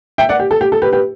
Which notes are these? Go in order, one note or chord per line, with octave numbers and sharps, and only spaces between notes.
E5 G5
D5 F#5
G4
A4
G4
A4
G4 B4
G4 B4